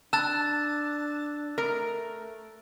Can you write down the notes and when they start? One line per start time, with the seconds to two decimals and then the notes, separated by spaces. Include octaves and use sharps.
0.13 D4 A5 E6 F#6 A6
1.58 A3 A#4